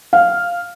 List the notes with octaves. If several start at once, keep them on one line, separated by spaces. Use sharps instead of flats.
F5